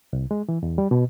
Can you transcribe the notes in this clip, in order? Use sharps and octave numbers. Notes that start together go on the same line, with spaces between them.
C2
G#3
E3
E2
G3
B2